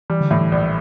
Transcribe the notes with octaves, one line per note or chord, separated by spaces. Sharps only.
E3 G3
D3
A2 E3
E3
A#1